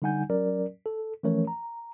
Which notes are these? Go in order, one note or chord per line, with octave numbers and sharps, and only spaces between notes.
D3 G3 D#4 F#5 G#5 G6
F#3 C#4 A#4 D5
A4
E3 F3 A3 C#4 A#4 C#5
A#5